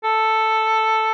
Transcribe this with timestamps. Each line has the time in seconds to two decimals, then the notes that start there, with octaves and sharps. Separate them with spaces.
0.04 A4